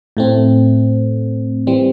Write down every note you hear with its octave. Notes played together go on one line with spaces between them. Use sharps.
A2 A3 C4
E3 G3 C4